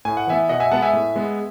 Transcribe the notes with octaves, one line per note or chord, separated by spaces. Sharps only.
A2 G#5
F#5
E3 B3 E5 G#5
B2 D#5 F#5
E5 G#5
G#3 B3 F#5 A5
E5 G#5
A2
G#3 B3